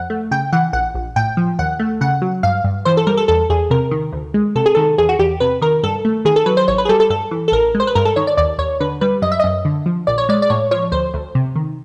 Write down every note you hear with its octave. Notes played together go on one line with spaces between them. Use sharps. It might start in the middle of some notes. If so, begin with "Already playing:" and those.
Already playing: F2 F#5
A3
C#3 G5
E3 F#5
A#1 F#5
A#1
A2 G5
F3
D#2 F#5
A3
C#3 F#5
F#3
G2 F5
G2
E3 C5
A4
G3 A#4
A4
E2 A4
E2 G#4
C3 A#4
D#3
D2
G#3
C3 A4
G#4
D#3 A4
E2 G#4
F#4
E2 G4
C3 B4
D#3 A#4
G2 A4
A3
D#3 G#4
A4
F#3 B4
C5
A1 C#5
B4
G#4
G3 A4
A4
G2 A4
E3
A4
A1 A#4
G#3
C5
B4
G2 A#4
A4
D#3 C#5
D5
D#2 D5
D#2 C#5
D3 B4
G3 B4
F#2 D#5
E5
F#2 D#5
D3
F3
A#1 D5
C#5
G#3 D5
D5
A2 C#5
F3 C#5
D2 C5
D2
C3
D#3